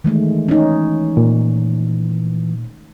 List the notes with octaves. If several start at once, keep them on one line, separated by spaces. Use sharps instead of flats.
D#3 E3 G#3 A3
C#4 D#4
A#2